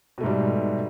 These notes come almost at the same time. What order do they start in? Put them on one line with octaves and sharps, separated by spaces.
B2 A3 G#2 G3